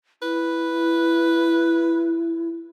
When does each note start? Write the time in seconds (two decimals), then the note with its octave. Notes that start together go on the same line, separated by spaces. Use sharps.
0.22 E4 B4